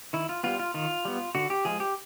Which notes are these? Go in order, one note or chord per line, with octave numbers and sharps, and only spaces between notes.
D#3 E4
F4
G3 B3 F4
F4
D#3 F4
G3 B3
D3 F#4
G4
F3 G#3 G#4
G4